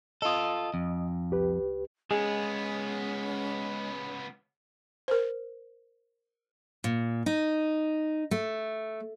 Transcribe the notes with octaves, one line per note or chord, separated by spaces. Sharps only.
F4 A4 D#5 D#6
F2
C2 G4 B4
C#2 G#3 B3 C#4 G#4
A#4 C5
A#2
D#4
A3